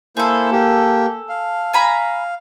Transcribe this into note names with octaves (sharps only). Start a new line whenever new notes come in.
A#3 E4 G#4 A4 C5
A#3 G4
F5
G#5 A#5 B5